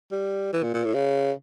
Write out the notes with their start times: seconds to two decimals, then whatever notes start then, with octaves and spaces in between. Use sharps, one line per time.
0.12 G3
0.53 E3
0.63 A#2
0.74 A#2
0.85 A2
0.94 C#3